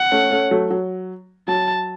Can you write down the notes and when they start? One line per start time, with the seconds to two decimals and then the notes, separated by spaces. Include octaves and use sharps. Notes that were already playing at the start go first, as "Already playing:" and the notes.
Already playing: F#5
0.12 A3 C#4
0.31 A3 C#4
0.51 F#3 A3
0.71 F#3
1.48 F#3 A5